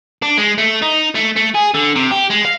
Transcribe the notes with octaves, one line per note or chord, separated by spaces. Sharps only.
D4
G#3
A3
D#4
A3
A3
G#4
D3
C3
G4
G#3
F5